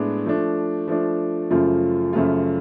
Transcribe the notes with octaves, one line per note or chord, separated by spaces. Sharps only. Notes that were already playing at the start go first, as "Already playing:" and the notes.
Already playing: A2 G#3 B3 D4
F3 A3 D4
F3 A3 D4
F#2 C#3 F3 A3 F4
F#2 C#3 F3 A3 F4